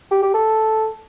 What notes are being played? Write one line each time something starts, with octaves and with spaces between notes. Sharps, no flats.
G4
G4
A4